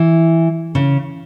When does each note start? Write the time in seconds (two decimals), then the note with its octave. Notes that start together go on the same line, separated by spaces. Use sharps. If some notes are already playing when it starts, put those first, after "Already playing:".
Already playing: E3
0.75 C#3